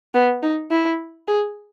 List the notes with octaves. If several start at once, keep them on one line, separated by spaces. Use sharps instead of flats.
B3
D#4
E4
G#4